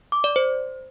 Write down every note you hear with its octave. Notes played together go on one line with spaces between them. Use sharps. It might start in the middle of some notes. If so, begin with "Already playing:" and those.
D6
D5
C5